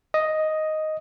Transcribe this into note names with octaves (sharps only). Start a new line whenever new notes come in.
D#5